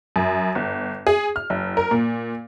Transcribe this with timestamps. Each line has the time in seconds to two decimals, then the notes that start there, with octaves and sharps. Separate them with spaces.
0.16 F#2
0.55 G1
1.07 G#4
1.36 F6
1.50 F#1
1.77 A#4
1.91 A#2